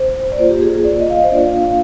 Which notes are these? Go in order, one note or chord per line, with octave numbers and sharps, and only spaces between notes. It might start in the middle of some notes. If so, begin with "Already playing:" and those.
Already playing: C5
D5
A#3 F4 C5
G4
G#4
G#4
D5
D#5
F5
D#5
C5
A#3 D4 F4 D5
F5
F5